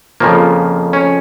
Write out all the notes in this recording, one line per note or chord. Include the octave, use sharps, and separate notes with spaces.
F2 C#3 F3 A#3
C#4